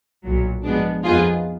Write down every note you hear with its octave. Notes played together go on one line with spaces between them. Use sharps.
B1 A#2 F#3
G#2 F3 G#3 B3 D4
F2 F3 B3 D#4 F4 G#4